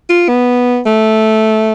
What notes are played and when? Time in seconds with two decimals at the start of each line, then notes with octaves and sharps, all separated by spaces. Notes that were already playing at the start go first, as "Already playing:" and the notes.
0.10 F4
0.28 B3
0.86 A3